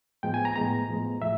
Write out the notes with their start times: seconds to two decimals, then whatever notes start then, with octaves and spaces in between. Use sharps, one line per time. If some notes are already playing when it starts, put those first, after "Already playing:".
0.23 A2 F3 G#3 B3 G5
0.34 G#5
0.45 A#5
0.56 A2 F3 G#3 B3 A#5
0.89 A2 F3 G#3 B3
1.21 A2 F3 E5